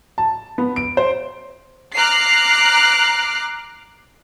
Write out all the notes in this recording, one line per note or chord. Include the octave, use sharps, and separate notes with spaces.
A5
B3
D7
C5
A#5 D6 F6 F#6 C7